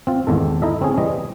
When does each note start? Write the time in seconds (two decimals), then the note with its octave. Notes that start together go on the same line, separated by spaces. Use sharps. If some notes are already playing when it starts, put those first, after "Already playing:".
0.07 C4 F4
0.27 G#1 E2 D#3 A4
0.62 D#4 E4 A4 D#5 E5
0.81 C4 C#4 G#4
0.97 E3 G3 D#5